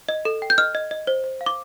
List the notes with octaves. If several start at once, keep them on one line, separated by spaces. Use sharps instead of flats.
D#5
A4
G5
G6
D#5 F6
D#5
D#5
C5
C5
F5
D6